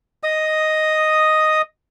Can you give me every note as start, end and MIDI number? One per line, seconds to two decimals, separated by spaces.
0.23 1.62 75
0.23 1.62 87